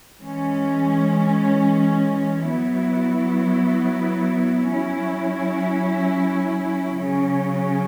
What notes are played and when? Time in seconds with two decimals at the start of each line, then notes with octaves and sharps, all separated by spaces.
0.21 E3 G#3 C#4
2.46 F#3 B3 E4
4.72 F#3 C#4 E4
6.97 C#3 F#3 C#4